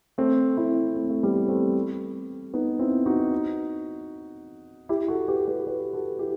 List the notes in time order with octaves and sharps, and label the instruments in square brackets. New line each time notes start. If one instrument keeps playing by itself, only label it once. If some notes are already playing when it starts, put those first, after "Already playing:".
[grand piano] A3 C4
C4 E4
A3 C4
A3
G3 B3
A3 C4
B3 D#4
C4 E4
D#4 F#4
E4 G4
F#4 A4
G4 B4
G4 B4
G4 B4
F#4 A4
E4 G4